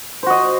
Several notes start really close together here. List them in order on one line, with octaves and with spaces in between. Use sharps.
C5 F#4 D#5